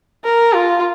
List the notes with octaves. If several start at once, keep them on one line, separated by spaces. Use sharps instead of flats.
A#4
F4